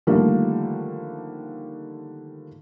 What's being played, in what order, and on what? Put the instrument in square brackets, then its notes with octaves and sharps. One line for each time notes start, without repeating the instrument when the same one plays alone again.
[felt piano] D3 D#3 F3 G3 A3 A#3